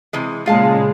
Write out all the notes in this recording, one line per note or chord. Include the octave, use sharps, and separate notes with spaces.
C3 E3 G#3
A#2 C#3 G#3 F4 F5 A5